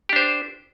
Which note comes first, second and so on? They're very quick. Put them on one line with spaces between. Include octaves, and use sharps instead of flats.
G4 D4 C5